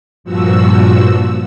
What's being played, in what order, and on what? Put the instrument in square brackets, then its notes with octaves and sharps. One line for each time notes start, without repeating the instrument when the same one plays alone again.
[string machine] G2 A#2 F3 F#4 E6